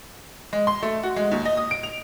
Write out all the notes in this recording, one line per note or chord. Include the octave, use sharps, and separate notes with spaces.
G#3
C6
A3
F#4
G#3
D#2
D#5
D#6
D7
F7